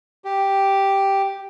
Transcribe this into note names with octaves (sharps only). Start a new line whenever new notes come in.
G4